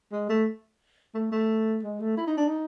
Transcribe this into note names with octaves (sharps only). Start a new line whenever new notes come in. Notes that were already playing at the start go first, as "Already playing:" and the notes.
G#3
A3
A3
A3
G#3
A3
E4
D#4
D4
D#4